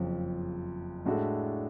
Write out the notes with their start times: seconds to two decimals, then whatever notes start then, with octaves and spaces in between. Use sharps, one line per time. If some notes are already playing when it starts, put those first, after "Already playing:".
Already playing: F#1 F2 C#3 F3
1.05 A2 G#3 D4 F#4 A4